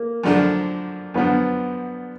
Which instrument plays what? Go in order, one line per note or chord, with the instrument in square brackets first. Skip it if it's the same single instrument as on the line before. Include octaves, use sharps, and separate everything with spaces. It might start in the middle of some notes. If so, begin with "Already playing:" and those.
Already playing: [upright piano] A#3
[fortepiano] F#2 D3 F3 A3 D4
[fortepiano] F#2 D3 F3 [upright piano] B3